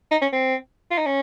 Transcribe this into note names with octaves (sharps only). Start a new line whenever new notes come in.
D#4
C#4
C4
F4
D#4
C#4